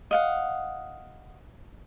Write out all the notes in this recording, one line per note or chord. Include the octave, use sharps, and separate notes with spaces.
D#5 F5 F#5